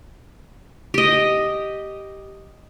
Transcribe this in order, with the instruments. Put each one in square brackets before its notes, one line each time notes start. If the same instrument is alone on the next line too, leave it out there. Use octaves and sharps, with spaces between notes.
[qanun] G4 D#5